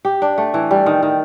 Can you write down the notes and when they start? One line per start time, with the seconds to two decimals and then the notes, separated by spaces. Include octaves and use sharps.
0.05 G4
0.22 D4
0.38 A3
0.54 E3
0.71 G3
0.86 D#3
1.03 D#3